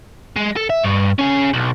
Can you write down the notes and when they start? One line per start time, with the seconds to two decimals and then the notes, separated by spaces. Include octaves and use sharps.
0.36 G#3
0.56 A4
0.70 E5
0.84 G2
1.19 C#4 G#4
1.54 B1